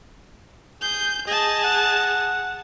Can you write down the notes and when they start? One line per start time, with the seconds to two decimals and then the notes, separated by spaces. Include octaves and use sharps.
0.82 G#4 G6
1.27 G#4 D#5 A5
1.64 F#5